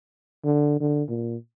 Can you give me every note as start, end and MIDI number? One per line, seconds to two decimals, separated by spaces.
0.45 0.78 50
0.80 1.03 50
1.09 1.36 46